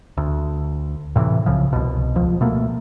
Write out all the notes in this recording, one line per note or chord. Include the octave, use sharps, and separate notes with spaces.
D2
A2 C3 D#3 E3
C2 C#3 F3
C2 B2
D#1 C#2 F3
B2 A3 A#3